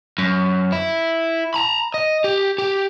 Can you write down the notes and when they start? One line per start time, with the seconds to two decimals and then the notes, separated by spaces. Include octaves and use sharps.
0.18 F#2
0.72 E4
1.54 A#5 B5
1.94 D#5
2.24 G4
2.58 G4